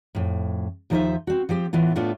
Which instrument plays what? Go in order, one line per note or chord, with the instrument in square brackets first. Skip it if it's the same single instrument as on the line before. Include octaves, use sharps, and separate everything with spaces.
[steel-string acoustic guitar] F2 A2
D#2 F3 D#4 A4 C5 E5
C4 F#4
F3 C4 G4
A2 E3 B3 F4
A2 A3 B3 D4 F4